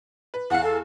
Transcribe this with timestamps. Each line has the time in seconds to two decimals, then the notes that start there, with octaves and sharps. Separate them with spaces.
0.34 B4
0.50 E2 F5 F#5
0.63 A4